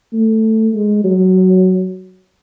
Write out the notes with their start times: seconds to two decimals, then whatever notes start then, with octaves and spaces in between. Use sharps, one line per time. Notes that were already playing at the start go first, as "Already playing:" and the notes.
0.13 A3
0.74 G#3
1.04 F#3